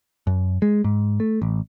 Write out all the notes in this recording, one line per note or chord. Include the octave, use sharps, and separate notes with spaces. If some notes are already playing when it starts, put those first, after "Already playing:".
F#2
G#3
G#2
A3
A1